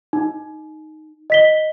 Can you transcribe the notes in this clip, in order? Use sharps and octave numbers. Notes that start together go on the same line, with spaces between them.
D#4
D#5 B6 G7